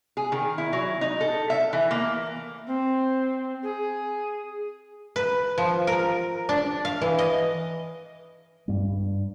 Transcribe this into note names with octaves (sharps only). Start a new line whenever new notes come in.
G#4
D#3
E4
F#3
D#4
A4
E5
E3
A#3
C4
G#4
B4
F3
A#4
D4
F5
E3
D#5
G2 G3